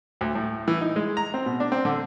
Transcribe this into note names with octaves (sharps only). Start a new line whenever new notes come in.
D2
A2
E3
D#4
G#3
A#5
C4
B2
D4
C4
D3